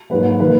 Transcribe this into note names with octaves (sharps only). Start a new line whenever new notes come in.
G#2 F#3 A#3 B4
D#3 A#3 B4